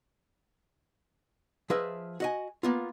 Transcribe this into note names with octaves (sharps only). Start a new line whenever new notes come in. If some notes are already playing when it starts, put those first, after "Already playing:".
F3 G#4 B4 D#5 E5
F#4 D#5 G#5
A#3 B3 F4